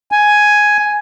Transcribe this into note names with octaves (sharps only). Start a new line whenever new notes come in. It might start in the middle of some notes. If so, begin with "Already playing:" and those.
G#5